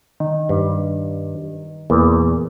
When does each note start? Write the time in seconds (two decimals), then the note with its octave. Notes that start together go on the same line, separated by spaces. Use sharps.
0.20 D#3
0.49 G2
1.90 E2 A#2